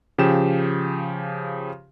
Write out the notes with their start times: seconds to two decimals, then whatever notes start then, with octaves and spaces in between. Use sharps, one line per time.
0.18 C#3 F3 G4 E7